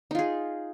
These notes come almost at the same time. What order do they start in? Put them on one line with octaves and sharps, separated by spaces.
D#4 F4 G#4